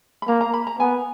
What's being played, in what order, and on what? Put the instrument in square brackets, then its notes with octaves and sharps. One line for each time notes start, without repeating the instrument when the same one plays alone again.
[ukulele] B5
[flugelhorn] A#3 [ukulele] A#5
[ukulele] A#5
B5
A#5
[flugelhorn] B3 [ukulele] G#5